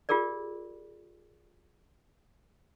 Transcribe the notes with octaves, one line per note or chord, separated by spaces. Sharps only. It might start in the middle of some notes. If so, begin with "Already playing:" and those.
F4 G4 G#4 A#4 D5